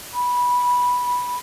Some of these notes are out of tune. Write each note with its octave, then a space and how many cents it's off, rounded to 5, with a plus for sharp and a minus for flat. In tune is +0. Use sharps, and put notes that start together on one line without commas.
B5 -10